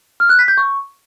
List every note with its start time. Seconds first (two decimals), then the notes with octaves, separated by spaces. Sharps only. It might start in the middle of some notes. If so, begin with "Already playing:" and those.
0.20 F6
0.29 F#6
0.39 B6
0.48 G6
0.58 C#6